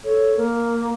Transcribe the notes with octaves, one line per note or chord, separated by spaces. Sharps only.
A4 C#5
A#3 A#4